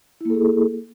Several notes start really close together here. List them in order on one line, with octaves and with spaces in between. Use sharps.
E4 A#3 A4 G#4